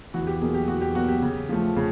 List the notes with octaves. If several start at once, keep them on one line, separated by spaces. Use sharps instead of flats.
E2 F#4
G4
B2 F#3 A#3 G#4
G4
E2 F#4
G4
B2 F#3 A#3 F#4
G4
C#3
F3 A3
C#3